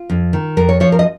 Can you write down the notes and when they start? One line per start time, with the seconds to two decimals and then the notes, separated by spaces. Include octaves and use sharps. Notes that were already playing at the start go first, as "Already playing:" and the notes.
Already playing: F4
0.10 F2
0.33 D#3
0.57 F2 A#4
0.69 C#5
0.80 F3 C#5
0.92 A#4
0.99 D#5